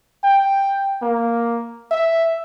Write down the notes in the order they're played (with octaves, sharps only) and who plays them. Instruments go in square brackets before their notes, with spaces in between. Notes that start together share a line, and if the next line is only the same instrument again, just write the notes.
[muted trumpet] G5
A#3
E5